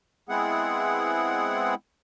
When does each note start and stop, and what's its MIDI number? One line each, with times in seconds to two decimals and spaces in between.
0.29 1.75 56
0.29 1.75 59
0.29 1.75 60
0.29 1.75 64
0.29 1.75 68
0.29 1.75 78